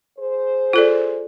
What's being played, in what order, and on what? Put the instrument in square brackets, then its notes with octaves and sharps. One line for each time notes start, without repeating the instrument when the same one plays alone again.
[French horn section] G#4 C5
[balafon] F4 A4 D5